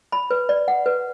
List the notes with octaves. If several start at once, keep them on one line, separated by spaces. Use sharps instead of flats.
B5
B4
D5
F#5
B4